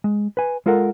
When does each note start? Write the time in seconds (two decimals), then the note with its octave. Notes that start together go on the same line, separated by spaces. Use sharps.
0.04 G#3
0.37 B4 G#5
0.66 G#3 F4 A4 A#4 F#5